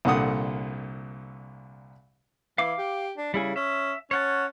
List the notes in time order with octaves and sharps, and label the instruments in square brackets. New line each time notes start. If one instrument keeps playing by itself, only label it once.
[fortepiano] C2 A#2 D3 F#5 D#6
[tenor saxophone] E3 [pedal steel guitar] F5 D6
[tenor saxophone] G4
D4
[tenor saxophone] C#3 [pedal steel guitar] G3 E4 G#4
[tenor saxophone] C#4 [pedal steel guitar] E5
[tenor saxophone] C#4 [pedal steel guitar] C#5 F#5 A5